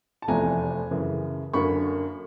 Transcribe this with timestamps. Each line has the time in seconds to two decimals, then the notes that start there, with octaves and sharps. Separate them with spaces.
0.22 A5
0.28 F1 E2 C3 F3 A3 G#5 A#5
0.91 F#2 C#3 E3
1.53 F#2 D3 F#3 A#3 C#4 B5 C#6